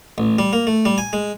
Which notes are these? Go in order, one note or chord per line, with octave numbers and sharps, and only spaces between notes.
A1
G3
A#3
A3
G3
G#5
G#3